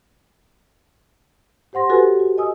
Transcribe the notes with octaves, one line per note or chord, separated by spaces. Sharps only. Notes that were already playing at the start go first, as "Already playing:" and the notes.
G4 C5 F#5 C6 A#6
F#4 G4 A4 B4 G#5
F#4
D#5 G#5 D#6 E6